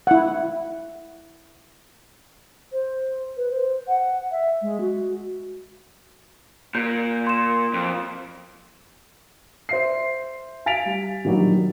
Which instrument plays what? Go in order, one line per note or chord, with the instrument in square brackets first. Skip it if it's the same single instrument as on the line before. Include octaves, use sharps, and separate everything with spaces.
[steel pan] E4 F#5
[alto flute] C5
B4
C5
F#5
E5
G#3
F#4
[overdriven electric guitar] A#2 [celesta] G6
[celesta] C6 E7
[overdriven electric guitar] F2
[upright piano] C5 E5 C7
F5 G#5 A6 B6 D7 F7
G3
A#1 D#3 F#3 G3 A#3